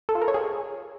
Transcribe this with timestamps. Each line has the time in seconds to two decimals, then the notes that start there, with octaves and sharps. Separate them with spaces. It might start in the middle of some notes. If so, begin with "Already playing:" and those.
0.09 A4
0.15 F4
0.22 A#4
0.28 C#5
0.34 G#4